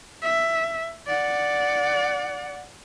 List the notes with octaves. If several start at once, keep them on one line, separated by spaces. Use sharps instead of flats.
E5
D5 F#5